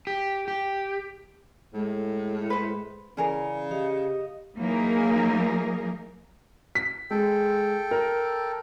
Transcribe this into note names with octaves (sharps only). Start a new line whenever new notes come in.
G4
G4
A2 G#3
B4 C5
C#3 E3 C#4 G#4 A#4 D5
G4 D#5 F5
E3 F#3 A#3 D#4 G#4 A#4
B6
G#3 A4 G5
A#4